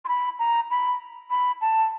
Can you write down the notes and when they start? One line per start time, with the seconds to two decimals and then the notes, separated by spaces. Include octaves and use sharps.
0.05 C6
0.08 B5
0.39 A#5
0.70 B5
1.30 B5
1.61 A5